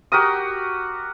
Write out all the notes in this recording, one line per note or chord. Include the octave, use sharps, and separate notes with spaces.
F#4 G4 A#4 D#6